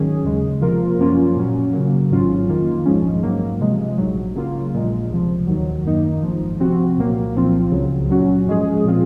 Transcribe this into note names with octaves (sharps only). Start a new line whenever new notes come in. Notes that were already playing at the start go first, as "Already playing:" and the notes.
Already playing: G#2 D#3 F#3 C#4 G#4
D#2 C#3 G#3
C3 F3 A#3 F4 A#4
F#2 F3 A#3 C#4 F4
A#2 F#3 C#4
C#3 F#3 A#3
G#1 G#2 F#3 C#4 F4
F2 D#3 A#3 F4
A#1 G#2 F3 G#3 C#4
G#2 F#3 A#3
C3 F3 G#3
A#1 G#2 F#3
C#3 F#3 A#3 F4
A#1 A#2 G#3
C#2 C3 F3
D#2 D#3 F#3
F#2 D#3 A#3 D#4
G#1 G#2 F3
C3 F3 C4 F#4
C2 A#2 F#3 A#3
C2 A#2 F3 C4 F4
C#2 C#3 F#3
A#2 F#3 C#4 F#4
G#2 F3 G#3 C#4 G#4
A#2 F3 C4 F4